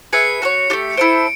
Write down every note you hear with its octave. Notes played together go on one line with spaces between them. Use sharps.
G#4 B4 E5 C#7
F#4 A4 C#5
A3 D4 G4
E4 A4 C5 D7